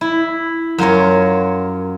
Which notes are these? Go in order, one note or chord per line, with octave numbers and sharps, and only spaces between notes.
E4
F#2 F4 A#4 C#5